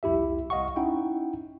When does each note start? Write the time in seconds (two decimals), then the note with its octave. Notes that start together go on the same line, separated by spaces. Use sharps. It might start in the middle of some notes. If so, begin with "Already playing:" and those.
0.03 C2 F2 E4 G4 E5
0.50 C2 D#5 F5 F#5 C#6
0.76 C#4 D#4 E4 F#5 G5